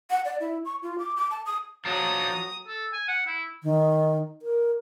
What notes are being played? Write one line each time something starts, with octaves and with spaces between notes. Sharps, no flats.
F#5
D5
E4
C#6
F4
D6
D6
A5
D#6
F3 F#3 D4 A#5 D#6
A4
G#5
F#5
E4
D#3
A#4